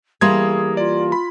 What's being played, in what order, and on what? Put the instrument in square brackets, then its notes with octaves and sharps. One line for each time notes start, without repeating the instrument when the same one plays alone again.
[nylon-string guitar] E3 G3 A#3 [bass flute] G#4 [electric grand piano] C6 D#6 G#6
[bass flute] F4 [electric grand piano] D5
[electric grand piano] B5